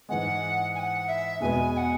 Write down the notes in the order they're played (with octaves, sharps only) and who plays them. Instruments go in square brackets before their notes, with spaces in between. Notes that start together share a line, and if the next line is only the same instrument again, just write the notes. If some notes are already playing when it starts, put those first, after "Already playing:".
[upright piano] G#2 E3 G#3 [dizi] F#5
[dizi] G#5
F#5
E5
[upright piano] E2 B2 G#3 B3 [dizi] G#5
[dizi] G#5
F#5